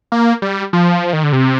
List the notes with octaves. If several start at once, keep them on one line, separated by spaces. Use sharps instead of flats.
A#3
G3
F3
D#3
D3
C3